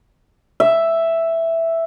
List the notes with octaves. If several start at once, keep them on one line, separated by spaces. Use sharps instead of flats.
E5